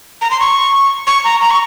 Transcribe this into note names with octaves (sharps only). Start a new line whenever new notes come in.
A#5
C6
C#6
C#6
A#5
A#5
C#6